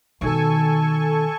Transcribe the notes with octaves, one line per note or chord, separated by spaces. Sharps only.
B2 D#3 A4 G#5 C#6